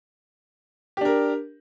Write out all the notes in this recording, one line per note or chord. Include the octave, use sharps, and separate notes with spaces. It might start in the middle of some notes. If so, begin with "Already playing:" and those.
D4 G4 A#4